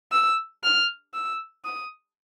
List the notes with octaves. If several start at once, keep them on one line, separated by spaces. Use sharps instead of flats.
E6
F6
E6
D#6